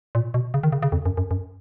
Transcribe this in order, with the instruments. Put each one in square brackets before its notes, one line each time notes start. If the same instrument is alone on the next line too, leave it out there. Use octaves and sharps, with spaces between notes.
[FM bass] A#2
B2
C#3
D#3
C#3
C#3
F2
F#2
F#2
F#2